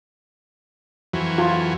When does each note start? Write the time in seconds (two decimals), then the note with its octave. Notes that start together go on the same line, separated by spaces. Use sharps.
1.13 F2 E3 F#3
1.38 F4